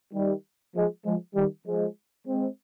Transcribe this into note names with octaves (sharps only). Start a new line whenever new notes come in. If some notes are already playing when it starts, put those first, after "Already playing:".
D#3 G3
F3 G#3
F3 G#3
D#3 G3
F3 G#3
G#3 C4